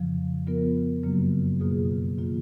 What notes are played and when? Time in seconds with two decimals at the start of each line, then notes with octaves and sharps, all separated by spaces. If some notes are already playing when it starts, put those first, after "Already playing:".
Already playing: F2 C#3 F3
0.47 F3 B3 F4 A#4
1.03 F#2 C#3 F#3 A#3
1.60 B2 A#3 F4 G#4
2.18 D#3 A#3 F4